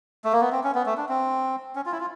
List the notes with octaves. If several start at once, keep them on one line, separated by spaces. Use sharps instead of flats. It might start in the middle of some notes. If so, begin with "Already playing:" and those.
A3
A#3
B3
C4
C#4
B3
A3
D4
C4
C#4
F4
E4
F4